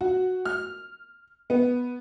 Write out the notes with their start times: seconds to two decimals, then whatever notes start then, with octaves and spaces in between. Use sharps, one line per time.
0.01 F#4
0.45 F6
1.50 B3